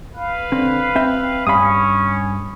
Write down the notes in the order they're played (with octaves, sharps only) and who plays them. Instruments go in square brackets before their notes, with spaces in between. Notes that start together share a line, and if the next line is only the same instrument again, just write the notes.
[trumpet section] B4 F5
[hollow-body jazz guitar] D3 C4
C4 E5 G5
[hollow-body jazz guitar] G2 F5 [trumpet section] C#4 [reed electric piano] B5 D#6